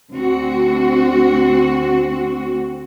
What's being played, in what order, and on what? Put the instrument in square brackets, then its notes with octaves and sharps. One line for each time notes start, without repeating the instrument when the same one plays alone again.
[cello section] D2 C4 F#4